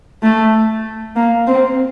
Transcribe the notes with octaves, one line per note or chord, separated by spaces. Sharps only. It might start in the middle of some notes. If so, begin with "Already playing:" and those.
A3
A#3
C4